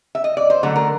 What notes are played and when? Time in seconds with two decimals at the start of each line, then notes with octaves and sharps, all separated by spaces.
0.15 E5
0.24 D#5
0.37 D5
0.50 C5
0.63 D3 F#3 A3 A4
0.76 A#4